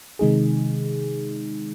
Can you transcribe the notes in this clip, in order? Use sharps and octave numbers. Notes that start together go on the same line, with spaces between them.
C3 D#3 G#3 D#4 G#4